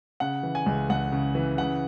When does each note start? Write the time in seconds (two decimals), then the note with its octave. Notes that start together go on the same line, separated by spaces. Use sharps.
0.20 C#3 F#5
0.43 E3
0.55 G#5
0.66 C#2
0.89 C#2 F#5
1.12 C#3
1.35 E3
1.58 C#3 F#5